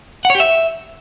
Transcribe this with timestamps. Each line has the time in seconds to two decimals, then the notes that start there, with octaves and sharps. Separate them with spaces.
0.25 F#5
0.30 C#5
0.35 G4
0.40 E5